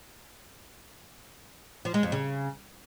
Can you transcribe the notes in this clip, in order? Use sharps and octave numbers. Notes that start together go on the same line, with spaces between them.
F3
G#3
F2
C#3